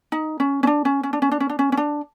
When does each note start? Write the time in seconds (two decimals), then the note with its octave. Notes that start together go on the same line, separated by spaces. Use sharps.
0.12 D#4
0.40 C#4
0.63 C#4
0.67 D4
0.85 C#4
1.03 C#4
1.13 D4
1.22 C#4
1.32 D4
1.40 C#4
1.50 D4
1.59 C#4
1.72 C#4
1.77 D4